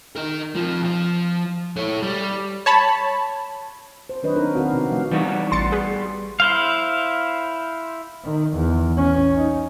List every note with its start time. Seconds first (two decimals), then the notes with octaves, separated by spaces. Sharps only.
0.16 A#4 D#5
0.55 F2 F3
0.84 F3
1.77 A4 C#5
2.02 G3
2.66 C#5 A5 B5
4.09 C5
4.23 D#3 F#3 D4 B4 C#5 D#5
4.35 C4 D4 D#4 A#4
4.55 D#3 C4 F#4 F5
4.70 C3 B3
4.91 F3 A3 F5
5.12 E3 G3 B3 D#4 F#4
5.52 A1 C6 A6 C#7
5.72 G#4 B4
6.40 E4 C5 F5
8.24 D#3
8.56 E2
8.98 C#4
9.36 D#4